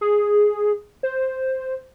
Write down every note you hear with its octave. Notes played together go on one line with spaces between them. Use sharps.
G#4
C5